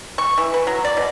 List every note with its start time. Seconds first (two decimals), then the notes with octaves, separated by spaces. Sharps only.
0.18 C#6
0.38 E3
0.54 B4
0.67 F#3
0.85 D5
0.97 B2